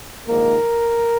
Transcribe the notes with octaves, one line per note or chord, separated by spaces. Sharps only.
A#1 G#2 D#3 A#3 A#4